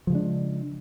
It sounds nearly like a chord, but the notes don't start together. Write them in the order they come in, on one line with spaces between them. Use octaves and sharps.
F3 C#3 G#3 D4